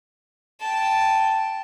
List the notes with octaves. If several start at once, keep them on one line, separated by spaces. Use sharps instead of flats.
G5 A5